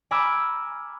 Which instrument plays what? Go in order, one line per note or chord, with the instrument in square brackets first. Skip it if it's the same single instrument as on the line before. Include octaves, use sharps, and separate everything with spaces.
[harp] G#5 A#5 B5 D6 E6 F6